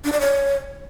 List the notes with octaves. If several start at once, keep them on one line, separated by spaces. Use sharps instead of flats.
D4
D5
C#5